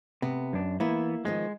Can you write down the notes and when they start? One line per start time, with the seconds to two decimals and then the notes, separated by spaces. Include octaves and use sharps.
0.22 C3 B3
0.53 F#2 D4
0.80 E3 A#3 B3 E4
1.25 D#3 F3 G#3 B3